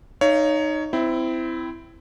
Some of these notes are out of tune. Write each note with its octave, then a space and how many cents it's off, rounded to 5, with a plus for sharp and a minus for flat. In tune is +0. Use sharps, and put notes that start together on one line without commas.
D#4 -10 C#5 +15 F5 -40
C4 -20 E4 +5